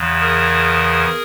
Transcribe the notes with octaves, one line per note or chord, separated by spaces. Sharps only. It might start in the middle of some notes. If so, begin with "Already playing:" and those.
Already playing: E2 C#3 E3
G#4 A#4